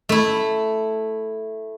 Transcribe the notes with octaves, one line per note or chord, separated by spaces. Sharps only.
A3 E4